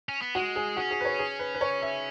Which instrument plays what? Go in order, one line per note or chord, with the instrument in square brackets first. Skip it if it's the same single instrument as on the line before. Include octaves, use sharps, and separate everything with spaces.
[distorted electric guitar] C#4
B3
[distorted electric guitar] G#3 [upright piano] F#4
[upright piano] G#4
[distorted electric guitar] C#4 [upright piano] F#4
[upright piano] G#4
B4
C#5
G#4
B4
B4
C#5
E5